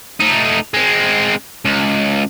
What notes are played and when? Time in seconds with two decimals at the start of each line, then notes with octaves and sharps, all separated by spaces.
0.20 A3 D#4
0.74 G#3 C4
1.65 C#2